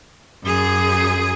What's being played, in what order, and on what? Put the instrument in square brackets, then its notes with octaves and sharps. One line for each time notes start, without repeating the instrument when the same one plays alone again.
[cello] F#2 G#4